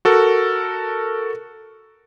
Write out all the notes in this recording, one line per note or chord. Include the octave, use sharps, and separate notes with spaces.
F#4 A4 A#4